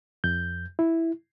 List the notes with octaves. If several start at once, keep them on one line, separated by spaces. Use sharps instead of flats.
F2 G6
E4